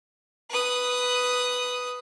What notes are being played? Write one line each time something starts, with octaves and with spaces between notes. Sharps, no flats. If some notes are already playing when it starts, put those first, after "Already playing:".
B4 D#6